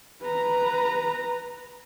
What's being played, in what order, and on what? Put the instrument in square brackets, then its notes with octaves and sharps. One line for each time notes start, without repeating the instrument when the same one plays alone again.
[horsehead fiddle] B4 A#5